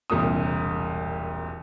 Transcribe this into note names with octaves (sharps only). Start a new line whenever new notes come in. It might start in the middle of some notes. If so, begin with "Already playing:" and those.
E1 C2 A#2 D#6